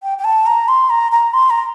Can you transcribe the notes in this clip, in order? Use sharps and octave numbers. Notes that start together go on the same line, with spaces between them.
G5
G5
A5
A#5
C6
A#5
A#5
C6
A#5